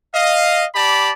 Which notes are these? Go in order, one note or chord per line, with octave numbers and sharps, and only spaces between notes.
D#5 F5
G4 D5 A5 B5